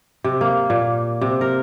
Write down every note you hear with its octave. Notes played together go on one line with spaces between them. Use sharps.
C3
A#3
A#2
C3
A#4